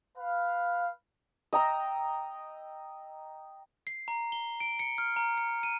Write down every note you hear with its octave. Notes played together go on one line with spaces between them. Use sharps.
B4 F5
D#5 G5 A#5 E6
C7
A#5
G7
D7
C#7
F6
A#5
C#7
D#7